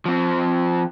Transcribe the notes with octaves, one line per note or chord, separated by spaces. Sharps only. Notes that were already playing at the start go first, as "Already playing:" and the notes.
F3 C4